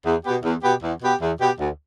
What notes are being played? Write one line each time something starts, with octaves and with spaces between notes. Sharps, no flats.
E2
B2 B3 G4
E2
B2 B3 G4
E2
B2 B3 G4
E2
B2 B3 G4
D2